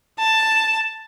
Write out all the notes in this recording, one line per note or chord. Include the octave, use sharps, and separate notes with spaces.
A5